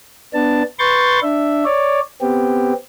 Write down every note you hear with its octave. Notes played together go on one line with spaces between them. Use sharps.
B3 D4 A5
B4 C6 C#6 G6 A6
D4 E5
C#5 D5
B3 C4 G4